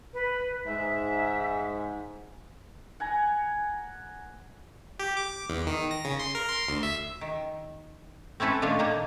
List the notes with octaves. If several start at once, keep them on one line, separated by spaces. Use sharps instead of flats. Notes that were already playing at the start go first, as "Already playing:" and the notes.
B4
G#2 E5
F#5 G#5 A#5
G4
D6
E2
D#3
A#6
C#3
C6
A#4
C6
D2
E5
D#3
C4 C#4 E4 A4 B4
A#2 D#3 A3 D4 F4 C#5
A#2 A#3 D#4